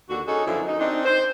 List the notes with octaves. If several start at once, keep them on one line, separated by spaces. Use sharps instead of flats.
D#2 D3 F#4
C#4 D#4 F#4 G#4 A4
F#2 D3 F3 B3 E4
D#4
C4 D4 D#4
C5